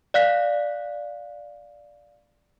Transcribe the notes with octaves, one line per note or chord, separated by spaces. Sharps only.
D5 F5 F#6 B6